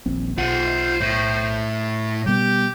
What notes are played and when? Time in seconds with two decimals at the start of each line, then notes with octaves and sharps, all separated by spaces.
0.06 D#1 A#1 C4
0.38 B1 F4 C5 F#5
1.01 A2
2.26 B2 G3 G4